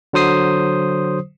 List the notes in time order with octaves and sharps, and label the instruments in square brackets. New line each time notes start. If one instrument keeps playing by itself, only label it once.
[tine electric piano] D3 F#3 C5 D#6 C7